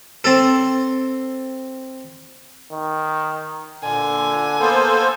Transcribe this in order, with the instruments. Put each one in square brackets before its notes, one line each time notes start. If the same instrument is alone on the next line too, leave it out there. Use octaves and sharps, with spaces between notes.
[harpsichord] C4 A4
[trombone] D#3
[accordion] A#2 [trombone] D3 [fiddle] G#5
[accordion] A#3 A4 C5 [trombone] B3